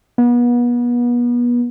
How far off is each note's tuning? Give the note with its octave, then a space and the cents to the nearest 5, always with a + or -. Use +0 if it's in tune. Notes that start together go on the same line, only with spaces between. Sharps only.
B3 -35